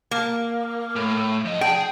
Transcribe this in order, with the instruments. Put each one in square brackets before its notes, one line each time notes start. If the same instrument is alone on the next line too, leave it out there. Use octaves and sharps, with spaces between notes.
[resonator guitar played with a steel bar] A#3
[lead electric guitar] A2
F3 D#5
[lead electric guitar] G#4 G#5 [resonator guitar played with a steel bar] G5